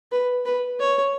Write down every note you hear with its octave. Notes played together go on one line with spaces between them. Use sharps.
B4
B4
C#5